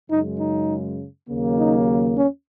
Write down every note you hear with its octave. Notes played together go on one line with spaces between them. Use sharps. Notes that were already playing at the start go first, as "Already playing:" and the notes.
F#2 C#3 G#3 D#4
D#4
D#2 C#3 F#3 A#3
D#4
C#4